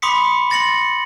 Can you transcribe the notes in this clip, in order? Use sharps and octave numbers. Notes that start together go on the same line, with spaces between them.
B5 C6 D6 D#6 B6 C#7
C6 A6 A#6 C#7 F#7